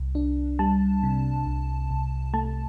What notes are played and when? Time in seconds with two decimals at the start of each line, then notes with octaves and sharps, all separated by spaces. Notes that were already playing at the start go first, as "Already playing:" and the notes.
Already playing: C2
0.15 D4
0.59 G3 A5
1.03 C3
1.46 C2
1.90 C2
2.33 A3 A5